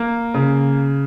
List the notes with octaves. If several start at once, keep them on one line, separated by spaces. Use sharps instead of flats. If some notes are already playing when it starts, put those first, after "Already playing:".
Already playing: A#3
C#3